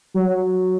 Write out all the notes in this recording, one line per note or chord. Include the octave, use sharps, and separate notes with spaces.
F#3